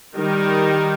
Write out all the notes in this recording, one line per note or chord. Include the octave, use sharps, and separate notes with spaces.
D#3 G3 D#4 A#4